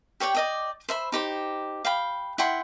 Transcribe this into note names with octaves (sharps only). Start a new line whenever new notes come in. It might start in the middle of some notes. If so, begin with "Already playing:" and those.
G4 C#5 D5 G5
D5 D#5 G5
C5 E5 B5
D#4 G4 C5
F5 G5 B5
E4 F#5 G5 C6